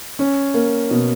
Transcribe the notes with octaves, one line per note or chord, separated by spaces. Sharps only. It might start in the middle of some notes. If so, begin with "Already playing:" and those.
C#4
A#3
B2